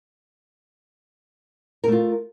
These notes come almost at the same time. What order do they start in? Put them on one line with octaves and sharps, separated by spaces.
A#4 A3 F4